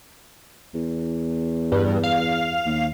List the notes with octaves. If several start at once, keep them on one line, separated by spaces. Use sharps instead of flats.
E2
G2
F5
D#2